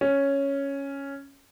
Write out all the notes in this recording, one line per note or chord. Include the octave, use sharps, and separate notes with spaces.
C#4